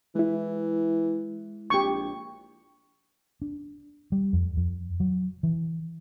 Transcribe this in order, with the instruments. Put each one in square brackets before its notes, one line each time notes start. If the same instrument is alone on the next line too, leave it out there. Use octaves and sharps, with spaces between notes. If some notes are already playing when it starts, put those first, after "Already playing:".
[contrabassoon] E3 [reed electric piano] G#3 E4
[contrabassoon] A#1 [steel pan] G4 C#6
[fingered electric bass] D4
G3
F2
F2
F#3
E3